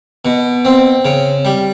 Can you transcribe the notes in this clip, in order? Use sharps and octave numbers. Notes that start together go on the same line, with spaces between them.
B2
C4
C#3
G3